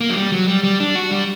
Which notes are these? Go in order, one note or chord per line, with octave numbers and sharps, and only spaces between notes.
A#3
F#3
G3
F#3
G3
G3
D4
F#4
G3